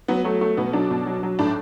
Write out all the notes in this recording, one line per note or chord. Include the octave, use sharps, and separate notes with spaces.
F#3 B3
F#3 A3
F#3 A3
B2 B3
F#3 D4
B2
F#3
F#3
A2 D4